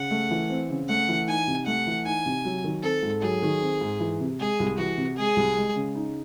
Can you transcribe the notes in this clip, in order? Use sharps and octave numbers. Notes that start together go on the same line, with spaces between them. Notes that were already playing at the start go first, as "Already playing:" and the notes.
Already playing: C#3 F#5
A3
E3
C4
C#3
A3 F#5
E3
D#4 G#5
C3
A3 F#5
E3
D#4 G#5
C3
F#3
D#3
C4 A4
G#2
F#3 G#4
D#3
C4
G#2
E3
C3
G#3 G#4
C2
E3 F#4
C3
G#3 G#4
C2
G#3
C#3
D#4